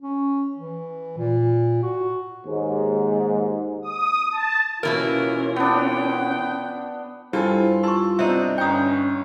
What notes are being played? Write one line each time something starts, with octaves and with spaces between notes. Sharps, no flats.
C#4
E3
A#2
F#4
D#2 G#2
D#6
A5
B2 E3 A#3 C#4 F4 A#4
B3 D4 G5
G2 E4 F4 A4 C5 G#5
F4 A5 C6 C#6 E6
B3 C4 D4 D#4 E5
G1 C#4 G5 A#5 D#6 G6